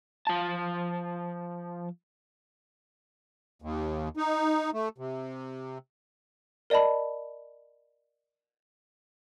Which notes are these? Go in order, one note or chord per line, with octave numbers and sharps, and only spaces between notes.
F3 A5
D#2
D#4
A3
C3
A#4 D5 D#5 A5 B5